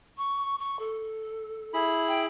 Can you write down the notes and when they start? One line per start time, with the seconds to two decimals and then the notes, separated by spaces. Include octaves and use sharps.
0.17 C#6
0.59 C#6
0.79 A4
1.74 E4 G#4 B5
2.08 G5